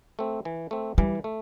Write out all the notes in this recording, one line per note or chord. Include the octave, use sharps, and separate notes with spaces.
A3 C4
E3
A3 C4
E3 G3
A3